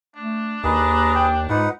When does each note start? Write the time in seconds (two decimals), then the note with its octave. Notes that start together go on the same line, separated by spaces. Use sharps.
0.16 A3 D4
0.64 D#2 G#4 B4 A#5
1.15 G5
1.49 G#2 D#4 F4 B4 F#5